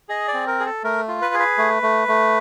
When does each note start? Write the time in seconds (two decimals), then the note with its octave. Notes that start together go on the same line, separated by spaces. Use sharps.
0.09 G#4 D#5
0.28 D5
0.34 C4
0.47 A#4
0.60 G#4
0.66 A4
0.84 A3 A#4
1.08 F4
1.22 B4
1.34 G#4
1.39 B4
1.58 A3
1.83 A3
2.08 A3